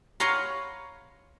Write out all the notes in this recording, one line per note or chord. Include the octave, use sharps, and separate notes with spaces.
B4 C#5 F5 F#5 A#5 C6